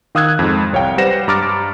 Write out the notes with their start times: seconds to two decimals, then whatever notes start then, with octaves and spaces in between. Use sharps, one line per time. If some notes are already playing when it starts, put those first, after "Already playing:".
0.15 D#3 F5 D#6 E6 F#6 G#6
0.39 F2 G#2
0.73 C2 C#5 F5 G5
0.98 G3 B4 C5 F#5 A#6 E7
1.28 G2 A#5 D6 F6 A6 D7